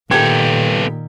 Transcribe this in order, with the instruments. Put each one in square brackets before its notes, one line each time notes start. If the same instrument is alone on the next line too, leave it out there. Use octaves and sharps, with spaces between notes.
[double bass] A#2 D#3 [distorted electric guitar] B3 A4 [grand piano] G4 [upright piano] G#6